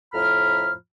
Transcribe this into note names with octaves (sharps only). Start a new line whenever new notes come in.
F2 A2 F3 A#5 B5 F6